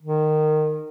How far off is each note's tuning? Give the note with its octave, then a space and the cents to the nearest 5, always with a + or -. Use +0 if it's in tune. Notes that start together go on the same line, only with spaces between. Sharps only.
D#3 -20